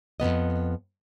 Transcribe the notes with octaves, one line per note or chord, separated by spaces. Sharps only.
F2 D#3 B3 D#5